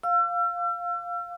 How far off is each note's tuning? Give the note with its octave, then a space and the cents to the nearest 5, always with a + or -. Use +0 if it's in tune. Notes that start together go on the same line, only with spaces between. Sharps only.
F5 +10 E6 +40